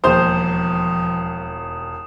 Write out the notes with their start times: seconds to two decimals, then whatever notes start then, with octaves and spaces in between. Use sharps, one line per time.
0.04 E1 D#2 F3 C5 D#6 G6 E7